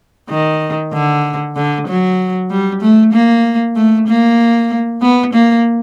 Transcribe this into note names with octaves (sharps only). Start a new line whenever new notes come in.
D#3
D3
D3
F#3
G3
A3
A#3
A3
A#3
B3
A#3